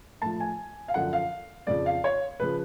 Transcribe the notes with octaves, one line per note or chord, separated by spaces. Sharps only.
A2 F3 A5
G#5
F5
F#2 D3 F3 F#5
F5
F2 C#3 F3 D5
F5
C#5
C#3 F3 B4